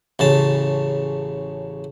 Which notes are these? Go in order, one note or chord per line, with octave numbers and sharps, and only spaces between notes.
A1 C#3 A5